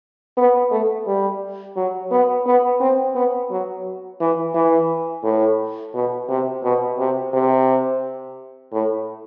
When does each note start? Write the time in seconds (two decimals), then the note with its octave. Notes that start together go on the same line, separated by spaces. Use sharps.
0.37 B3
0.71 A3
1.07 G3
1.76 F#3
2.11 B3
2.46 B3
2.80 C4
3.15 B3
3.50 F#3
4.20 E3
4.55 E3
5.24 A2
5.94 B2
6.29 C3
6.63 B2
6.99 C3
7.33 C3
8.73 A2